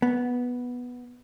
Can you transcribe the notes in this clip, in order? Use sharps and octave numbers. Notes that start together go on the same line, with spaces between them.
B3